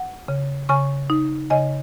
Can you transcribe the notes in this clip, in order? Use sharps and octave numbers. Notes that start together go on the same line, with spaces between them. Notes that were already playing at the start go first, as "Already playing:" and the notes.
Already playing: F#5
C#3
C#3 G#5 C#6
D#4
C#3 D#5 G#5